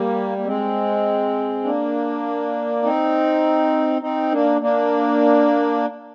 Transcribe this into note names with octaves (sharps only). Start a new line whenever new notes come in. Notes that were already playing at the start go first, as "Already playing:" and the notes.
Already playing: G3 A#3
A#3
G#3 C4
A#3 D4
C4 D#4
C4 D#4
A#3 D4
A#3 D4